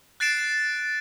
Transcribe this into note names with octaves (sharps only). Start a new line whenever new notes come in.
F#6 A6 C7 D7 E7